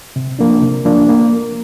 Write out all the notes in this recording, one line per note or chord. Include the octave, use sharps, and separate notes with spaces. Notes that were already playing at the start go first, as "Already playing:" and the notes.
C3
F3 A#3 D4
C3
F3 A#3 D4
A#3